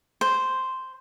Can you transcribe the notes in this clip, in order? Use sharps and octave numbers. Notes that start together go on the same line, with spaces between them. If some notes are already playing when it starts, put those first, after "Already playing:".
C5